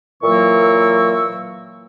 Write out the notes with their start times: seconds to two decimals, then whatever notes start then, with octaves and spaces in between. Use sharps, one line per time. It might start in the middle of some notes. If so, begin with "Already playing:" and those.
0.23 A#2 E3 F#3 A#3 C#6 E6